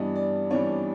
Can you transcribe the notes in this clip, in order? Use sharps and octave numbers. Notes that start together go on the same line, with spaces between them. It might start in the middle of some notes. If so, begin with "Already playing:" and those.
Already playing: G2 E3 G3 B3 D4 D#5
D5
G2 E3 G3 B3 D4 C#5